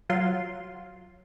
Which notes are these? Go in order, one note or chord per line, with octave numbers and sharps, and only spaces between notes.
F#3 F4 C6